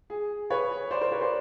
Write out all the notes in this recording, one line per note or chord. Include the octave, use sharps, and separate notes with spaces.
G#4
B4 C#5
C5 D5
A#4 C5
B4 C#5
C5 D5